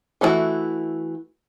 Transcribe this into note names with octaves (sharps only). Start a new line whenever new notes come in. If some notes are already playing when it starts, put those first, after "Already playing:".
E3 A3 D4 E4 F#4